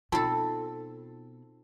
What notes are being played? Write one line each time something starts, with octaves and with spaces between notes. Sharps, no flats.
B2 C4 D#4 F4 A4 A5